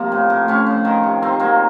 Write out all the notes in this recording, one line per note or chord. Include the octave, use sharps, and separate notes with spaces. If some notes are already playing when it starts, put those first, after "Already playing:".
Already playing: C3 F3 A#3
A2
A2
A2 C#4
F3
D#3
C3
D#3 C4
F#3 A#3